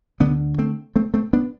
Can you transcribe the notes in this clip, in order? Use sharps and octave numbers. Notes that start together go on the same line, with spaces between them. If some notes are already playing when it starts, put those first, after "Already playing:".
D2 D3 B3 D4
A3 C4
A3 C4
A3 C4
B3 D4